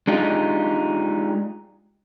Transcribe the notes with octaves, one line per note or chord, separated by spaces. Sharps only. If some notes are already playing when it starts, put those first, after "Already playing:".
G#3 D4 D#4 F4 G4